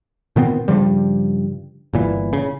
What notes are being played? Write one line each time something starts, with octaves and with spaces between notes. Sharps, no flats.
A#2 D#3 B3 C4
G2 C#3 F3 G3
G1 A#2 E3
C#3